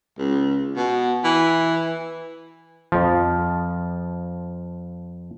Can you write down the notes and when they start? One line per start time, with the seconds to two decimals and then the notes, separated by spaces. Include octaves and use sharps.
0.18 C#2
0.76 B2
1.24 E3
2.92 F2 F3